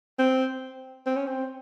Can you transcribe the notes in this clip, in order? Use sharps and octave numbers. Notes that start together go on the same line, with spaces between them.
C4
C4
C#4
C4